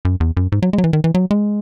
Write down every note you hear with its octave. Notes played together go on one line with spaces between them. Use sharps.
F#2
E2
F#2
G#2
F#3
G#3
F#3
E3
D#3
E3
F#3
G#3